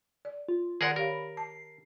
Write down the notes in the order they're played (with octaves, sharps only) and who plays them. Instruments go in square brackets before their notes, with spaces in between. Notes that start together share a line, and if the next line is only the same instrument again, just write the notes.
[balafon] D5
[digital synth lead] F4
[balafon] D#3 D5 C6 [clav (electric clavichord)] G#4 A#4 F#5
[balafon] G4 C#5 F5 [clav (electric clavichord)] A#4 [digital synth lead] B5
[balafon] A5 [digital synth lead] C7